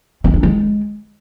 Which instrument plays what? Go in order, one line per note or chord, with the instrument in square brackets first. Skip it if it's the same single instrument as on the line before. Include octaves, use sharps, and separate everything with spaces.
[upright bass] C4
D4
G#3